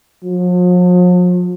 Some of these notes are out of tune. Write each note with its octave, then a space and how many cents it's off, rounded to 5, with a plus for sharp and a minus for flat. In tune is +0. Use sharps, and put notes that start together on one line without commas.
F3 +45